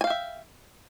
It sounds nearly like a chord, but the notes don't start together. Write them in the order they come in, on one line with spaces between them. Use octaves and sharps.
G#5 F5 G5 E5